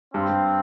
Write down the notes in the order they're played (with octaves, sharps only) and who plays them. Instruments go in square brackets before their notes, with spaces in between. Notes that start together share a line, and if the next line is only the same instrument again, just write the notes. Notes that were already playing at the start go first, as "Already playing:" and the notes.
[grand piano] G2 [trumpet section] C4
[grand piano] G2